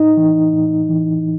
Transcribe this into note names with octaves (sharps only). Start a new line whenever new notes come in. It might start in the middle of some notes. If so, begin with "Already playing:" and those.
Already playing: A2 D#4
E3
A2
E3